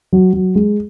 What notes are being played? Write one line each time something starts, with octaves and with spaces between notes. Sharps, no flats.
F#3
F#3
G#3